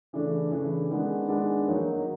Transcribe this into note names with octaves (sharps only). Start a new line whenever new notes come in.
C#3 E3 A3 D4
C#3 E3 A3 D4
D#3 G#3 B3 D4
D#3 G#3 B3 D4
D#3 F#3 A#3 D#4